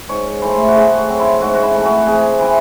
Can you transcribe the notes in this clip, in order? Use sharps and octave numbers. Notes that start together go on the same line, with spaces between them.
G#2 C#5
E3 A3 C5
F#4
A2 G#4
F#4
F#3 C4
E4
G#2 F#4
F#4
E4
E3 A3
F#4
C3 G#4
E3 C4 E4